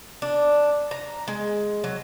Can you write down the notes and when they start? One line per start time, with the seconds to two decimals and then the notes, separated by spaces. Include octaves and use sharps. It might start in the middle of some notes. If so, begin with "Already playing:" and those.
0.22 D4
0.91 A#5
1.28 G#3
1.84 F#3